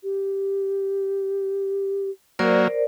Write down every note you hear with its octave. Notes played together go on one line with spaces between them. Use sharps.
G4
F#3 A#3 A#4 C5 D5